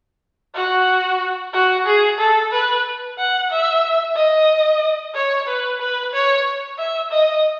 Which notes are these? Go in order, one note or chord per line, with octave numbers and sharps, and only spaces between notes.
F#4
F#4
G#4
A4
B4
F#5
E5
D#5
C#5
B4
B4
C#5
E5
D#5